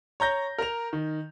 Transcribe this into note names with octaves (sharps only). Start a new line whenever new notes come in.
C#5 A#5 G6 A#6
A#4 A#5 F7
D#3